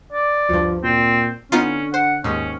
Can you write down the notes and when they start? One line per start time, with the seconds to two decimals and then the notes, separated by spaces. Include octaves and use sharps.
0.13 D5
0.49 D2 G2 F3
0.84 A#2 C4
1.52 D3 B3 C#4 D#4 F4
1.94 C5 F#5
2.24 D#2 G#2 C#4